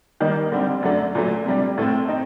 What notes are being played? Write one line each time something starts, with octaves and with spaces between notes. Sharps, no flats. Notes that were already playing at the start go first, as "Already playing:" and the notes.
D#3 G3 A#3 D#4
D3 G3 C4
F#2 D3 A3 D4
A#2 F#3 A3
C3 G3 D4
A2 A3 C4
C4 D#4